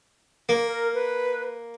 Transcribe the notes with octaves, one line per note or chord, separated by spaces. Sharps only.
A#3
A#4
B4